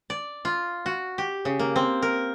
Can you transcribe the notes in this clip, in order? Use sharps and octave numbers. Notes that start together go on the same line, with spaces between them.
D5
F4
F#4
G4
C#3
A#3
C4
A#4